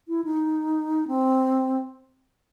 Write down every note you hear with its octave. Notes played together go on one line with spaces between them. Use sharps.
E4
D#4
C4